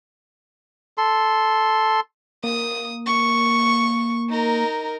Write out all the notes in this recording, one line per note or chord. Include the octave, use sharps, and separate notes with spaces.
A4 C6
A#3 D#6
C#6
D#4 A#4